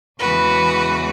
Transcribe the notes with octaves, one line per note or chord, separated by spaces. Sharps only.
E2 C#3 E3 G#3 F#4 B4